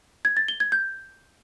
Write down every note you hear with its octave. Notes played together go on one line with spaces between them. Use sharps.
G#6
A6
G7
G#6
G6